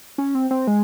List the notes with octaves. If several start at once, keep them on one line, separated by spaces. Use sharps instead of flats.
C#4
C4
C4
G#3